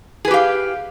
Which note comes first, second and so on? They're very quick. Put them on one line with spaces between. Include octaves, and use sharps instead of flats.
G#4 B4 G4 F5